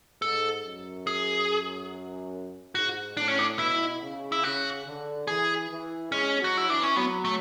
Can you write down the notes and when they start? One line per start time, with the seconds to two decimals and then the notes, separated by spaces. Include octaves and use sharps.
0.22 G#2 A4
0.64 F#2
1.07 G#4
2.75 G#2 F#4
3.17 A2 D4
3.28 C#4
3.39 D4
3.59 B2 E4
4.02 C#3
4.32 E4
4.43 C#3 F#4
4.86 D3
5.27 E3 G#4
5.70 E3
6.11 G#3 C#4
6.41 F#3 F#4
6.57 E4
6.68 E3 D4
6.83 C#4
6.96 F#3 B3
7.25 A3